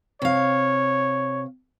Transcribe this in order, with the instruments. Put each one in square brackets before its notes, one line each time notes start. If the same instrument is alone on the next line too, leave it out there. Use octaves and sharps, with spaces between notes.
[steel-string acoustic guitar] C3 F5 [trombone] C#5